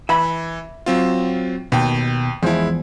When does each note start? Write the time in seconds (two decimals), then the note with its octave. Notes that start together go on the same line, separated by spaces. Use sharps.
0.09 E3 E5 B5
0.86 F#3 C4 F4
1.72 D#2 B2 G5
2.43 E2 F3 G#3 E4